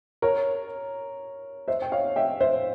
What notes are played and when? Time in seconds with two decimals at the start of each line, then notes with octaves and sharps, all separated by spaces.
0.22 A#4 C#5
1.68 C5 E5
1.82 G5
1.92 C#5 F5
2.16 E5 G5
2.41 C5 E5